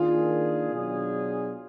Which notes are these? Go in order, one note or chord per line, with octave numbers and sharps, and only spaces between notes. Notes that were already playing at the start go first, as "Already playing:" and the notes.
Already playing: D#3 A#3 D4 F4 G#4
B2 F#3 D4 G#4